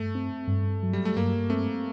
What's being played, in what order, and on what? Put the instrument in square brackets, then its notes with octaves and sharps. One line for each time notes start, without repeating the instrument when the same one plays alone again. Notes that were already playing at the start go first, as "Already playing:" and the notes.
Already playing: [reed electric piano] G2 [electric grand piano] A3
[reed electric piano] C4
G2
F#3
[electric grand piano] G3
A3
[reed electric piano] G2 [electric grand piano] A#3
[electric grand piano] A3 [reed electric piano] C4